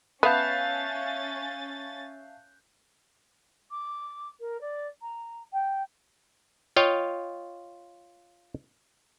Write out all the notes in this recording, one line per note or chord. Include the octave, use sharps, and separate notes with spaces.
B3 C#4 E5 F5 A5 F#6 G6 A6
D6
A#4
D5
A#5
G5
F4 C#5 D#5 F5 G5